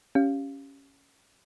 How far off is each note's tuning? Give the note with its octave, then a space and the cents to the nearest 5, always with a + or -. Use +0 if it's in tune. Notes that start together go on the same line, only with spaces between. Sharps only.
C#4 +0 G4 +0 F5 -5